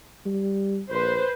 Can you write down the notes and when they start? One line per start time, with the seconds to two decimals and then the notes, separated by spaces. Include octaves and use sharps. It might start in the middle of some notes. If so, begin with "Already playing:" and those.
0.26 G3
0.90 A#1 B4 C5